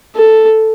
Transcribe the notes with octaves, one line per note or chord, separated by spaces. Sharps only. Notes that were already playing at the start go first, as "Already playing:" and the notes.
A4